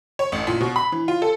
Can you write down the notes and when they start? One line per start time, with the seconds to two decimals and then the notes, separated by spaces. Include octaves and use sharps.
0.19 C#5
0.32 A1
0.47 A#2
0.61 B2
0.76 B5
0.92 E3
1.08 F4
1.22 A4